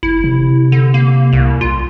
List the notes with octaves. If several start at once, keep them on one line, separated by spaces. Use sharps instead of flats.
F#1 E4
C3
D3
A#3
C2
B1 F4